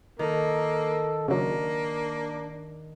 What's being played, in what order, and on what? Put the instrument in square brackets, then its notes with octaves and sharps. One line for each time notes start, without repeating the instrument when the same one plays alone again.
[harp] D#3 [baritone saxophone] A#3 [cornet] A4
[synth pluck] C#3 F#3 [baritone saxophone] A#3 [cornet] D4